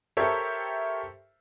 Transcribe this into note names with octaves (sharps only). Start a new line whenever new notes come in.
G4 A4 A#4 C5 C#5 E5